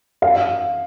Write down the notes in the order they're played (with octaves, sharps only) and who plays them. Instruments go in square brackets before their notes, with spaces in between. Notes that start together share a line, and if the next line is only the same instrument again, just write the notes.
[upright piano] F5